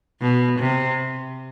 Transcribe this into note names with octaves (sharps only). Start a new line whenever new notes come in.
B2
C3